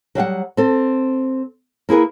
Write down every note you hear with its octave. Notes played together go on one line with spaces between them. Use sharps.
F#3 G3 F5 F#5
C4 A4
A#3 E4 G#4 A#4 B4